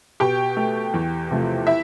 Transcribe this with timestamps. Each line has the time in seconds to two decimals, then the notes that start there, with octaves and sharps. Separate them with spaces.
0.20 B2 G4 G5
0.57 A3
0.94 E2
1.31 C3 F3 A3
1.67 E4 E5